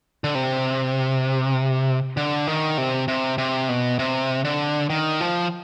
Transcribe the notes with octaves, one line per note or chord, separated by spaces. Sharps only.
D3
C3
D3
D#3
C3
C3
C3
B2
C3
D3
D#3
F3